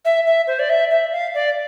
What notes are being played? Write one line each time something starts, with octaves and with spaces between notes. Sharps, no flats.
E5
E5
C5
D5
E5
E5
F5
D5